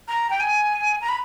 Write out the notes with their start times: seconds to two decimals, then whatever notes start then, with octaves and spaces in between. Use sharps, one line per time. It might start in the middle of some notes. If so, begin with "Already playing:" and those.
0.08 A#5
0.30 G5
0.40 G#5
1.01 A#5
1.09 B5